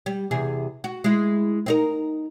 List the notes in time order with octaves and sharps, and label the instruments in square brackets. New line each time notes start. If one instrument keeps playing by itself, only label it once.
[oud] G3
E2 C3 G#4
F#4
G#3 E4
C4 D#4 A#4